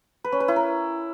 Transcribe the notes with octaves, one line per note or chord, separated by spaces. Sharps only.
B4
C#4
B4
E4
A#4